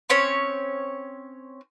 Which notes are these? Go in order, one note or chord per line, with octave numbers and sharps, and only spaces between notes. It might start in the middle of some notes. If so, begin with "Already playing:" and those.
C4 C#4 C#5